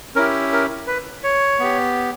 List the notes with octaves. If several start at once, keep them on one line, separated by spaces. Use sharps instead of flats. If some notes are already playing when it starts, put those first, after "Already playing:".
C#4 E4 G4 A#4
A#4
B4
C#5
B3 G4